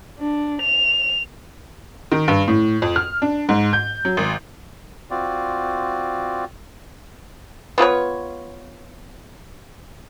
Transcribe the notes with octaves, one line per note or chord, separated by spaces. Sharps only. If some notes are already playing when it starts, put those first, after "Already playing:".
D4
F7
D#3
G2
A2
F2
F6
D4
G#2
G6
F#3
G#1
C4 F4 F#4 D5
B3 F4 B4 C#5